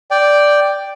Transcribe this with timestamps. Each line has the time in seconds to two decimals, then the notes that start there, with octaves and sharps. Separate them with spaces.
0.11 D5 G5